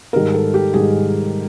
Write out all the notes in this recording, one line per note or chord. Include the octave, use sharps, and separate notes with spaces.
G#2 D#3 G3 A#4
A4
G4
G#2 D#3 G3 G#4